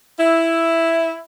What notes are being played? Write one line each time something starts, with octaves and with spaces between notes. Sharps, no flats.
E4